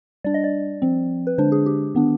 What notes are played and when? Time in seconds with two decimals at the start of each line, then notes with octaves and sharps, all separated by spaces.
0.24 G3 D4 D5
0.34 D#5
0.44 D5
0.82 F3 C4
1.27 B4
1.38 D3 G#3 D4 C5
1.52 G#4
1.66 G4
1.95 D#3 B3 D4